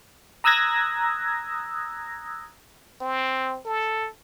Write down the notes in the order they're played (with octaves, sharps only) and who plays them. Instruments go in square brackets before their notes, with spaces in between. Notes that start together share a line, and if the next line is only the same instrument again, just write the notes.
[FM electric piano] A#5 D#6 E6 F#6 G#6 A#6
[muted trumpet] C4
A4